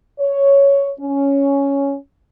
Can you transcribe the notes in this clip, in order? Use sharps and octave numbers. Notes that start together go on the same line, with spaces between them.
C#5
C#4